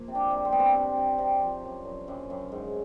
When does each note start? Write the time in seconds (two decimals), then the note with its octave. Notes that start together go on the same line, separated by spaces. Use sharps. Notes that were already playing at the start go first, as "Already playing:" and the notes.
Already playing: F3 A#3
0.08 C3
0.15 D4
0.31 C3
0.45 C4
0.52 G3 B3
0.60 C4
0.75 C3
0.97 C3
1.19 C3
1.42 F3
1.64 F#2
1.85 F#2
2.08 F#2
2.30 F#2
2.52 G#2